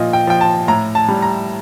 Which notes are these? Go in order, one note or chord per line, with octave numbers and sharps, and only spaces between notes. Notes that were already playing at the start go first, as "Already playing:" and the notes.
Already playing: A#2 F3 D#5
G5
F3 G5
A5
A2 A#5
A5
G3
A#5